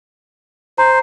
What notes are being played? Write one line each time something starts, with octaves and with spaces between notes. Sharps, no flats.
C5 A#5